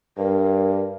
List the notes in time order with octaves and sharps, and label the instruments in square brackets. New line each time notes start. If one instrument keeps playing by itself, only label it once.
[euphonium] G2 [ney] A#4